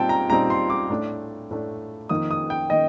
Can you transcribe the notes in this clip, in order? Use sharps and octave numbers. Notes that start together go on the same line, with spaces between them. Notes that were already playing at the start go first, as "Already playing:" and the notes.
Already playing: A#2 G3 C4 D#4 G5 A5
A#5
A#2 G3 C4 D#4 A#5
C6
D6
A2 A3 D4
A2 A3 D4
F2 D#3 A#3 D#4 D#6
D#6
G5
D#3 A#3 D#4 D#5